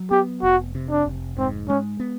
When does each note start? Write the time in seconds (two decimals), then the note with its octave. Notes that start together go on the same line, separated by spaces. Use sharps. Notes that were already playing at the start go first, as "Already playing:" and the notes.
Already playing: F#3
0.11 B3 G4
0.42 F1 F#4
0.75 C3
0.90 D4
1.06 F1
1.38 G#2 C4
1.68 G#3 C#4
2.00 B3